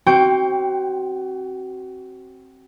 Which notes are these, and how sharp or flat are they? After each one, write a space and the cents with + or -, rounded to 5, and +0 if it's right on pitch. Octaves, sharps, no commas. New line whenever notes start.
C4 +20 F#4 +30 G5 +0